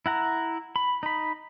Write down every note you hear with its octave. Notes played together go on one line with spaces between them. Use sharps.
E4 F#5 A#5
B5
D#4 B5